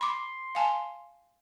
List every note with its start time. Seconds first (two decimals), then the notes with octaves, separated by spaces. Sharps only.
0.01 B5 C6 D6
0.55 F5 G#5 A5